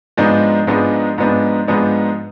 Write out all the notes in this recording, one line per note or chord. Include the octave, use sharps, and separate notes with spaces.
G#2 F3 G#3 B3 D4
G#2 F3 G#3 B3 D4
G#2 F3 G#3 B3 D4
G#2 F3 G#3 B3 D4